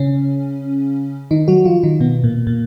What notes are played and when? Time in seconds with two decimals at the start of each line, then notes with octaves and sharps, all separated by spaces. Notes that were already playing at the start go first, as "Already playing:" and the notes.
Already playing: C#3 C#4
1.31 D#3 D#4
1.48 F#3 F#4
1.65 F3 F4
1.83 D#3 D#4
2.00 B2 B3
2.24 A#2 A#3
2.47 A#2 A#3